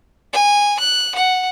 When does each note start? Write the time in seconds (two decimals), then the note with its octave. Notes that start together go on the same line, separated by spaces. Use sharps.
0.33 G#5
0.80 F#6
1.15 F#5